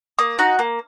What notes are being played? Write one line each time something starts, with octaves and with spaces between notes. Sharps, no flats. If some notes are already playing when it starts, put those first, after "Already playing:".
A#3 D#6
D#4 F#4
A#3